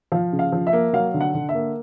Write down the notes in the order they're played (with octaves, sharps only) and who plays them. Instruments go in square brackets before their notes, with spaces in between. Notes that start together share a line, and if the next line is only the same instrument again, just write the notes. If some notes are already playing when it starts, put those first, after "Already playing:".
[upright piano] F3 F5
C#3
F5
F3
E5
A#3
F#3 F5
D3
F#5
D3
E5
A#3